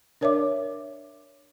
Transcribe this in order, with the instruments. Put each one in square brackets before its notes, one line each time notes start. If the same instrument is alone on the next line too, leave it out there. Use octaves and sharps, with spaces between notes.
[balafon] D4 A#4 C#5 D5 E5 D6